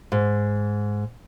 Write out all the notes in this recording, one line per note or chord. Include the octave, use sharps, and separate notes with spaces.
G#2